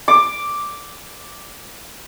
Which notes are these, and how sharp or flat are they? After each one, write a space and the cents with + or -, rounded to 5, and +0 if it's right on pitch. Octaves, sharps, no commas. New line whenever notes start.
D6 +0